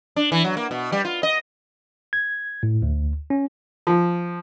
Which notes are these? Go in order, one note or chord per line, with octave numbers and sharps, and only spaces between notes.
D4
E3
F#3
A#3
B2
G3
F4
D#5
G#6
A2
D2
C#4
F3